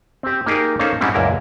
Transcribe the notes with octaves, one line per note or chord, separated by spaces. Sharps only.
C4 G4
A#3 D#4 G4 G#4 A#4
A#3 C#4 D#4 A4 C5 F5
G#2 G3 G#3 C4 C#4 E4
C#2 F#2 A#2 E4 A#4 A#5